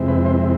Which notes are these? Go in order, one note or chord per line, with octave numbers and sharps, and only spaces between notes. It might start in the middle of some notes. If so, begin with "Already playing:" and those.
Already playing: F2 C3 G#3 C4 E4
B4
C5